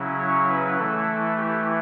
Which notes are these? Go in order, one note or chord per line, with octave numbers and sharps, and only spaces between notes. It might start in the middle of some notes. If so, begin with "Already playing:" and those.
Already playing: C#3 F#3 C#4 E4
C#5
B4
E3 A3 E4 A4
G4